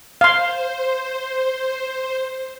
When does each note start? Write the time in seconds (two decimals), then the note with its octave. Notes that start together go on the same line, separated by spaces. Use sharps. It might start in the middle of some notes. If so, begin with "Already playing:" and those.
0.21 C5 F5 C6